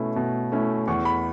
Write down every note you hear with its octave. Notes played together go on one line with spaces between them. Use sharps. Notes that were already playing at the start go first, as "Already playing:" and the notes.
Already playing: B2 A3 C#4 E4
B2
A3 C#4 E4
E2 C#6
B5